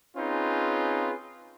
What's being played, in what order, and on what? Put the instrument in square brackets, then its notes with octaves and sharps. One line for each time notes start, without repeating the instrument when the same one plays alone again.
[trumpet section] C4 C#4 D#4 F4 G#4 B4